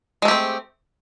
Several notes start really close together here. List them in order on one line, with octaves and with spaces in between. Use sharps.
G#3 A3 G4 C4